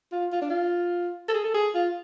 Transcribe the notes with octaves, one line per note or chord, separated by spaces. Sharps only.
F4
F4
D4
F4
A4
G#4
A4
G#4
F4